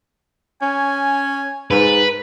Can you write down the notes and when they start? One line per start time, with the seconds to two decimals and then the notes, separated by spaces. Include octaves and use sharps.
0.62 C#4 G#5
1.71 G#2 B4